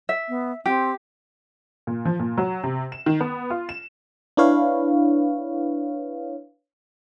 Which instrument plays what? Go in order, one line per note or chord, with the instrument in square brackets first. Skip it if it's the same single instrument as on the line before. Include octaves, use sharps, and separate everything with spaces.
[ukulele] E5
[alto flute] B3
[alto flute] C4 [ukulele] G4
[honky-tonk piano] A#2
F3
A#2
F#3
C3
E7
D#3
B3
F4
E7
[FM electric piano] D4 E4 B4 C#5 F5